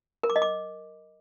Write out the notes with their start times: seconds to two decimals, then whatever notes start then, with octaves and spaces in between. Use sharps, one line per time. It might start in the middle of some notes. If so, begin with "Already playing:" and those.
0.23 A#4
0.30 D6
0.36 D#5
0.42 D6